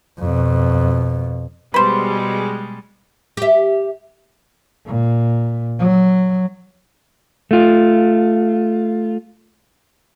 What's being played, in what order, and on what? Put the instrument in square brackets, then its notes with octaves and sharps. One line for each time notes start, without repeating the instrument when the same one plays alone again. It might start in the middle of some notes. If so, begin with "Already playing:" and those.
[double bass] F2 B2
[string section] B2 G3 G#3 [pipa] B4 C5
[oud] G4 E5
[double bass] A#2
F#3
[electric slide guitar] A3 F4